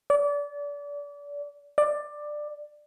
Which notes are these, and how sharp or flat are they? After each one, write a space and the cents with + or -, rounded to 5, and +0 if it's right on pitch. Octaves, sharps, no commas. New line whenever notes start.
D5 -30
D5 +15